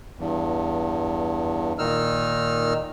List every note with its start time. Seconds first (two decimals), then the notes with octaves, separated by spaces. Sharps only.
0.18 E2 G2
1.78 A#2 D#3 D#4 E6 F6